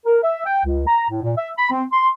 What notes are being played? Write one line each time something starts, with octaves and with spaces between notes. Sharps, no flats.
A#4
E5
G5
C#2
A#5
A2
A#2
E5
B5
C4
C6